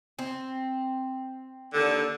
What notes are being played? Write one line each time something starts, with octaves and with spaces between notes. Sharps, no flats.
C4
D#2 D3